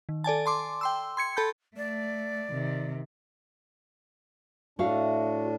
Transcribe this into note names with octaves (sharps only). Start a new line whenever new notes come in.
D#3
A4 D5 G#5 A5
A5 C6 D6
G5 C6 E6
C6 G#6 C#7
A4 A5 B5 G6
A3 D5
C3 D#3
A2 D4 F#4 E5 F5